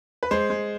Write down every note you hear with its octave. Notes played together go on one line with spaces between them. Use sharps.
B4
G#3 C5
G#3